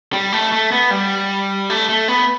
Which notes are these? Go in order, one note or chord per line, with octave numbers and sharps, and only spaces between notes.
G3
A3
A3
B3
G3
A3
A3
B3